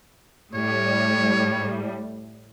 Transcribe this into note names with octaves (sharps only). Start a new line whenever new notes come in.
A2 G3 C#5